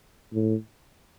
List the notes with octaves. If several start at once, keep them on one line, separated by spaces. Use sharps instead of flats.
A2